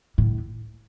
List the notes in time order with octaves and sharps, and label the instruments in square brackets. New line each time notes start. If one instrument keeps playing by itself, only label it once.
[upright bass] A2